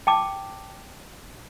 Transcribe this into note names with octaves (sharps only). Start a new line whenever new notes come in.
G5 A5 D6